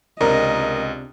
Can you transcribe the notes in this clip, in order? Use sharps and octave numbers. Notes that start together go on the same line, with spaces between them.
C#2 C3 D4 A#4 D#5 D#6